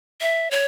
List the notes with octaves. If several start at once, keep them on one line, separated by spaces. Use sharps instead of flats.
E5
C#5